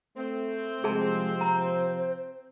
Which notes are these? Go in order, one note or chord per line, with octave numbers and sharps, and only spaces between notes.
A3 C4
C3 F3 G#3 G#4 A5
C5 A#5